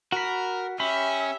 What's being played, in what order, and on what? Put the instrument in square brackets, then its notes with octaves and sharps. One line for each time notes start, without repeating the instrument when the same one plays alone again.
[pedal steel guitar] F#4 B5 [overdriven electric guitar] A#4
[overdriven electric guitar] C#4 [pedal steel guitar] G4 B5 [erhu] E5